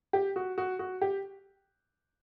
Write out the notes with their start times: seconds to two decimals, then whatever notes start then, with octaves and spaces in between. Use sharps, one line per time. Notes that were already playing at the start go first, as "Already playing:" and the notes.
0.13 G4
0.36 F#4
0.58 F#4
0.79 F#4
1.01 G4